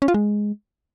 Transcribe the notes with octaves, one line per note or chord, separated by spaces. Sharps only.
C#4
F4
G#3